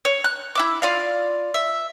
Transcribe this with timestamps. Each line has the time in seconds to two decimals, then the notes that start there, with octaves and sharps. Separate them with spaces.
0.05 C#5
0.24 F#6
0.55 E4 E5 D6
0.82 F4 D5 F5
1.54 E5